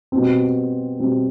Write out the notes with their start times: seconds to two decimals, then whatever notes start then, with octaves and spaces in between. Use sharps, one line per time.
0.12 B2 G3 C4
1.00 B2 G3 C4